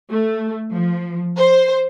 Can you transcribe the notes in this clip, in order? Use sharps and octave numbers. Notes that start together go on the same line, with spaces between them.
A3
F3
C5